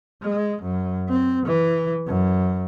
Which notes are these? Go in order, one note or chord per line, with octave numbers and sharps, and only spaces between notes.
G#3
F#2
C4
E3
F#2